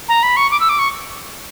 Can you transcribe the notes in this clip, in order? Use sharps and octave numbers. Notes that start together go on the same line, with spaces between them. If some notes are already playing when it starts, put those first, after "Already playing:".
A#5
B5
C#6
D6
E6
D6
C#6